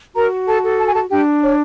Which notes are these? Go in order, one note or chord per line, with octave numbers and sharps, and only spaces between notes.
F#4 A#4 A#5
A4 A5
A4
A5
G#5
A4 A5
D4 G4 G5
C#5